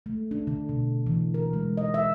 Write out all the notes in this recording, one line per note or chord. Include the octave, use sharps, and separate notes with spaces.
A3
D4
D3
B2
E3
A#4
G#3
D#5
E5